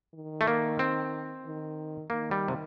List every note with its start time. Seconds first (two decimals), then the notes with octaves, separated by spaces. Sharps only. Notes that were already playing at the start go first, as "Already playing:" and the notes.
0.14 D#3
0.41 A3
0.47 A#3
0.79 C4
1.45 D#3
2.10 D#3 A#3
2.31 G3
2.48 C3